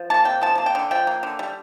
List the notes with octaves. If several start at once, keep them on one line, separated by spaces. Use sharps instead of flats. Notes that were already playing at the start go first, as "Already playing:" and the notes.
Already playing: F3
A#3 A5
C3 G5
F3 A5
A#3 A5
G5
D3
F3 G5
A#3
D3
G3